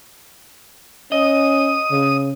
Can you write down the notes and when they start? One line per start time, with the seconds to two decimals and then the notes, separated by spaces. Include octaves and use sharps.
1.12 C#4 D#5 D#6
1.92 C#3